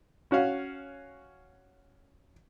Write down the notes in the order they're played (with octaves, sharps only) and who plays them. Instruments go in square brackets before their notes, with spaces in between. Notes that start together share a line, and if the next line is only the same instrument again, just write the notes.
[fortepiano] C#4 F#4 C#5 F5